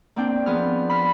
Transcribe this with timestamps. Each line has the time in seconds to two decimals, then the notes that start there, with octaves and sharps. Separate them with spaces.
0.16 A#3 C4 D4 G5
0.46 F3 B3 G#4 F6
0.90 B5 F6